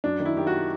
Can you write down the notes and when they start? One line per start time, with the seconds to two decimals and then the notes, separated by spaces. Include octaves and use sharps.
0.04 F#2 D4
0.20 D#3
0.25 E4
0.37 D#3 G4
0.47 F#4